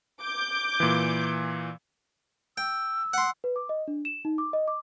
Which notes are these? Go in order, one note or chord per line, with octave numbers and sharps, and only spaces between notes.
D6 G6
A#2 E3
G5 E6
F#5 C6
B4
D6
D#5
D4
E7
D#4
D6
D#5
D6